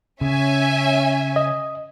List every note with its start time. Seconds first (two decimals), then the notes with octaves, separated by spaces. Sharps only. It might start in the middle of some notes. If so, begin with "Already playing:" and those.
0.21 C#3 C#4 E5 G#5
1.36 D#5